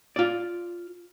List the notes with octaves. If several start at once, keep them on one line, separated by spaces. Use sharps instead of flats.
F4 D5